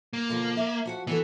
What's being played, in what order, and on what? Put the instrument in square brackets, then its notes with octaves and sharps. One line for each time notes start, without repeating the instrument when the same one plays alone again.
[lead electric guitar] A#3
[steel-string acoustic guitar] B2 D3 F3
E5
F3 F#4 F#5
[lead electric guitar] E3 [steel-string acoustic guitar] B3 F#4 A4